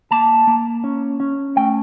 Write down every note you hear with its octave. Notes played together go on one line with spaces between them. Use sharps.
A#3 A5
A#3
C#4
C#4
A3 G5